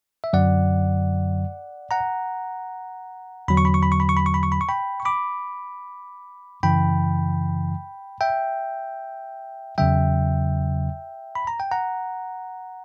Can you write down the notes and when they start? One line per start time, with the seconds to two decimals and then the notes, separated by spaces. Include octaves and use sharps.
0.24 E5
0.33 F#2 D3 F#3 D5 F#5
1.91 F#5 A#5
3.48 E2 D3 F#3 B5
3.57 C#6
3.65 B5
3.74 C#6
3.83 B5
3.92 C#6
4.00 B5
4.09 C#6
4.17 B5
4.26 C#6
4.34 B5
4.43 C#6
4.52 B5
4.61 C#6
4.69 G5 B5
5.00 C#6
5.05 B5 D6
6.63 F#2 C#3 E3 G5 B5
8.21 E5 G5
9.78 E2 C#3 F#3 E5 G5
11.35 B5
11.47 A#5
11.60 G5
11.71 F#5 A#5